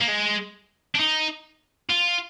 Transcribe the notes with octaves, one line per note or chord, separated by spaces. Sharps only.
A#3
G#3
D4
D#4
F4